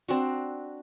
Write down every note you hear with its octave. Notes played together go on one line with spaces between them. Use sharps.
C4 D4 F#4